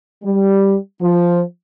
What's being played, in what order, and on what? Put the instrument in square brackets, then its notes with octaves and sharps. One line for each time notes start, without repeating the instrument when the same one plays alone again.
[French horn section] G3
F3